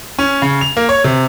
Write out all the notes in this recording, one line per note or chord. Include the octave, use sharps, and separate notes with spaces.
C#4
C#3
F7
A#3
C#5
C3